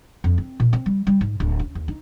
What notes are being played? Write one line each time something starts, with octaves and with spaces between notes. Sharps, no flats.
F2
C4
A#2
C4
G3
G3
G#2
D1
C#4
D#2
D#4